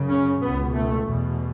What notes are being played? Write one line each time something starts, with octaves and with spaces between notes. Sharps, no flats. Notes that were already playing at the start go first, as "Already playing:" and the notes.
Already playing: F#2 C#3
C#4
C#2 B2 B3
A3
E2 B2